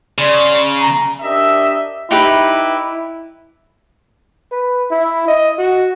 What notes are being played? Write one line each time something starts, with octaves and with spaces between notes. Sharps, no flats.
C#3 D5 C6
A#5
D4 G4 A#4 D#5 E5
D#4 E4 G4 B4
B4
E4
D#5
F#4